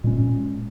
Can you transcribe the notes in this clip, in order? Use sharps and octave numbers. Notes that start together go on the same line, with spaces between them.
A#2 G#3 C#4